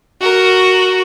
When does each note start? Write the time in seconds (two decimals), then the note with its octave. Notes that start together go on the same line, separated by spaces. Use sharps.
0.21 F#4 A#4